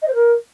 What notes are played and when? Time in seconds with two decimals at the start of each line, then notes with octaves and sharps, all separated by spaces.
0.02 D#5
0.08 C5
0.14 A#4